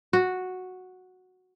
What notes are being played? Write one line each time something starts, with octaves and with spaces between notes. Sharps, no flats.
F#4